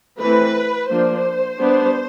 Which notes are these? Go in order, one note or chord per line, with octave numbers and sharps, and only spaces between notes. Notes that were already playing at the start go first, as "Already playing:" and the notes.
E3 A3 C4 B4
F3 A#3 D4 C5
G3 B3 D4